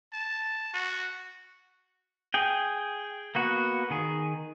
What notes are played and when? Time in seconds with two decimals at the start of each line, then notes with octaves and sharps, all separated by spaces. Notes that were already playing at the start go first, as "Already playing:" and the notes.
0.13 A5
0.74 F#4
2.34 G#4 G5
3.35 A#3 B3 F#4
3.90 D#3 G#4